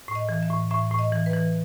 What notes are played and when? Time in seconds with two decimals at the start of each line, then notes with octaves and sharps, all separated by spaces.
0.08 A2
0.15 D#5
0.29 E3
0.43 E5
0.50 A2
0.71 A2 E5
0.91 A2
0.99 D#5
1.12 E3
1.26 B4
1.33 E3